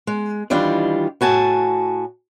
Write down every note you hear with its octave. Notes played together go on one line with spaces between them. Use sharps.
G#3
D#3 E3 G3 D4 F4
A2 F#4 G#5 A5